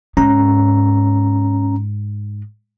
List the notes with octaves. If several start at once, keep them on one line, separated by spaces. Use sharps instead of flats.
G#2 C#4 A#5